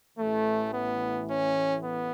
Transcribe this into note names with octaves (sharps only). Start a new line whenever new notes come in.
A1 A2 E3 A3
B3
C#4
B3